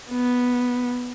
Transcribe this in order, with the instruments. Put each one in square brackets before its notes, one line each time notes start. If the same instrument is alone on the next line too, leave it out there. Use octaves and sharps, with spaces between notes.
[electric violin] B3